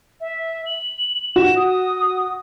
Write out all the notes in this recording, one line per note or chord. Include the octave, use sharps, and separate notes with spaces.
E5
F#7
F#4 E7
D#6